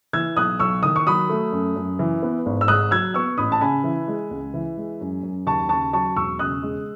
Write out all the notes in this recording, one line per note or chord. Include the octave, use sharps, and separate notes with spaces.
E3 E6 G#6
B1 D#6 F#6
B1 C#6 E6
D#3 D#6
C#6
F#3 B5 D#6
A3
F#2
F#2
E3
B3
G#1
E6
G#2 D#6 F#6
F#3 E6 G#6
B3 C#6 E6
A1 B5 D#6
A5
C#3 G#5 B5
E3
G#3
C#2
E3
G#3
F#2
F#2
D#2 A5 C#6
C#3 A5 C#6
F#3 A5 C#6
E1 C#6 E6
C#3 D#6 F#6
G#3